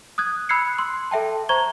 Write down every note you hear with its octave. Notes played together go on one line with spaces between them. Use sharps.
D#6 F#6 G#6
B5 E6 F#6 G#6 C7 C#7
C6
A4 E5 G5 A5
C5 A#5 C#6 G#6 G7